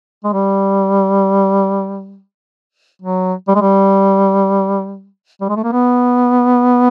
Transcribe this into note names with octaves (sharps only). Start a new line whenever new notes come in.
G#3
G3
F#3
G3
G#3
G3
G3
G#3
A3
A#3
B3